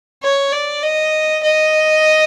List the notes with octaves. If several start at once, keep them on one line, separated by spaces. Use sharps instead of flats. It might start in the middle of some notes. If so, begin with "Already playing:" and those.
C#5
D5
D#5
D#5